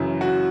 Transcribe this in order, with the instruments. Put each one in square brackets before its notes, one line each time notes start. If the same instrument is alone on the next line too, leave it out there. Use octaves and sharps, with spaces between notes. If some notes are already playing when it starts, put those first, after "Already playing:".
Already playing: [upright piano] F#2 C#3 E3
F#4